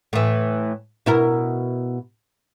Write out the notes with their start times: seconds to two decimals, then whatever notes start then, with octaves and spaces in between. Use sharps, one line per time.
0.13 A2 E3
1.06 B2 E4 A#4